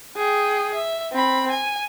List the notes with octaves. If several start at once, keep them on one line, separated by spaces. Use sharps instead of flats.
G#4 G5
E5
C4 B5
G#5